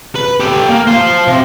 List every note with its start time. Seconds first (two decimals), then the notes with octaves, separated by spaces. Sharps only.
0.15 B4
0.40 G4 A4
0.69 A#3
0.87 C5 F5
1.28 C3